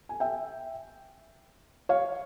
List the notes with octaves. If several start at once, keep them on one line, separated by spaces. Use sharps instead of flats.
G#5
E5 G5
C#5 F5